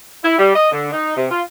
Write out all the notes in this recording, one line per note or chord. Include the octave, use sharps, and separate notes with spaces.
E4
G3
D#5
D3
D#4
C3
F4